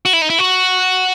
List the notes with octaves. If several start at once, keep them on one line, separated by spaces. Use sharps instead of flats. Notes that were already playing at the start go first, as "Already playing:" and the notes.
F#4
E4
D#4
E4
F#4